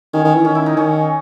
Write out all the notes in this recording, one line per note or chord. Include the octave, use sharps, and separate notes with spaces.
D#3 C#4
D#3
E3
D#3 C#4
E4
D#4
D#3 C#4